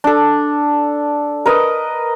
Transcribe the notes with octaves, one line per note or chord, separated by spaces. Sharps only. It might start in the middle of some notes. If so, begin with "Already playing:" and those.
D4 A4
A#4 B4 D#5